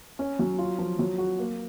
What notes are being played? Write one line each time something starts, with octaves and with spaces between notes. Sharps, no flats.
C#4
F#3
F4
F3
F#3
F#4
A#3